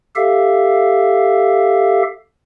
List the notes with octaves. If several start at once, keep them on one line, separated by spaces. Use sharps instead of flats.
G4 A4 E5 F5